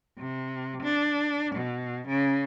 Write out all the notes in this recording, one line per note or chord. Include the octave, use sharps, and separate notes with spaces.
C3
D4
B2
C#3